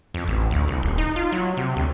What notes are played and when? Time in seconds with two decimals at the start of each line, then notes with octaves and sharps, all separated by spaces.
0.14 F2
0.28 A1
0.51 D2
0.68 C2
0.83 D#1
0.98 D#4
1.16 F4
1.32 F#3
1.57 C3
1.77 D2